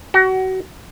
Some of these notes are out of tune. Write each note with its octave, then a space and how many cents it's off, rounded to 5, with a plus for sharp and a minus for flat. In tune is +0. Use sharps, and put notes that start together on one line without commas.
F#4 +30